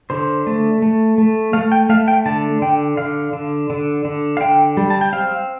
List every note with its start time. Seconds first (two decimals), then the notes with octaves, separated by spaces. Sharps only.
0.10 D3 C5
0.47 A3
0.82 A3
1.18 A3
1.53 A3 F5
1.72 G5
1.89 A3 F5
2.08 G5
2.26 D3 A5
2.62 D3 G5
2.97 D3 F5
3.33 D3
3.70 D3
4.05 D3
4.37 F5
4.41 D3 G5
4.77 G3
4.90 A5
5.01 G5
5.13 C4 F5